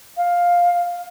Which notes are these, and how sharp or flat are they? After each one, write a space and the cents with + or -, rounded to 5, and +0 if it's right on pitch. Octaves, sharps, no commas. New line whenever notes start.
F5 +10